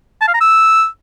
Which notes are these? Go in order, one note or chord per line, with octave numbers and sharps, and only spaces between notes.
A5
F5
A#5
E6